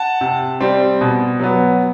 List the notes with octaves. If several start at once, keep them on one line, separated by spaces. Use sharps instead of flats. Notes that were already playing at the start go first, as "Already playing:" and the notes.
Already playing: F#5 A5
C3
G3 C4
B2
F#3 B3